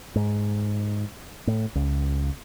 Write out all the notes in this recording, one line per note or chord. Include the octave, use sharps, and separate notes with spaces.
G#2
A2
C#2